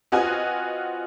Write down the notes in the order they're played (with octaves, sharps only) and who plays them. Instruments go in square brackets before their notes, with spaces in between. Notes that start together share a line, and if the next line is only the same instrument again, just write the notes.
[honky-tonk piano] C4 F4 F#4 B4 D#5 G#5